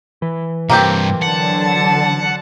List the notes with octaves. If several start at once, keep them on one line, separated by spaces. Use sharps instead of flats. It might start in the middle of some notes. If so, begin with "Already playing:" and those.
E3
G2 C3 A#3 C4 G4
D3 F#3 F#5 A5